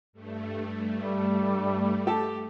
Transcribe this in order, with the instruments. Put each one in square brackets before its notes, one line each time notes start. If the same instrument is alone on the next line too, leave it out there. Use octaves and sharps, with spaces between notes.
[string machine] G2 A3
[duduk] G3
[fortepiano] G4 A4 A5